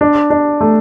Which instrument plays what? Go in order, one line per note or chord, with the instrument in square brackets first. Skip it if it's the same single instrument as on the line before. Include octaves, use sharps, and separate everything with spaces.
[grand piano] D4
D4
A3